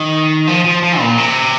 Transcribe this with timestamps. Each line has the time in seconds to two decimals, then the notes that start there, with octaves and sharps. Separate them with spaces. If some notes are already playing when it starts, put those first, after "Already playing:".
Already playing: D#3
0.47 F3
0.65 F3
0.83 F3
1.00 A#2
1.18 C3